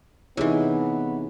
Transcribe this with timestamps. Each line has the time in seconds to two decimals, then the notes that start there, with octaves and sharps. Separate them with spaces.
0.37 C3 E3 B3 D#4 E4 G#4 C#5